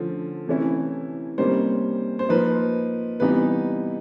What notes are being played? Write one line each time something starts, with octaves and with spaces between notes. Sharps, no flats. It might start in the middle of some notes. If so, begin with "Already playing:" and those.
Already playing: D3 F3 A3 C#4
C3 E3 A3 C#4 E4
C3 D#3 G3 A#3 C#4 C5
C5
F3 A#3 D#4 B4
C3 E3 G3 B3 D#4 B4